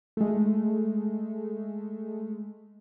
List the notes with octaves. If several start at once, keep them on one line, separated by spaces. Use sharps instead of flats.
G#3 A3